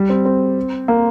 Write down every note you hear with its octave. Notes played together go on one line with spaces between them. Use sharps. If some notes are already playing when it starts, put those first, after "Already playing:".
Already playing: G3
C4
C4
A#3